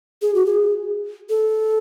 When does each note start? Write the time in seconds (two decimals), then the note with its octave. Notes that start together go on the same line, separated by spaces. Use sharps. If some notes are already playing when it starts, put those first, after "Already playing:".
0.22 G#4
0.35 F#4
0.46 G#4
1.29 A4